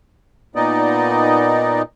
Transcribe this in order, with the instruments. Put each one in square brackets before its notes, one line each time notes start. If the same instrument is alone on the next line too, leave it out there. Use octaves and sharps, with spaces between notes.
[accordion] A#2 B3 D#4 D5 D#5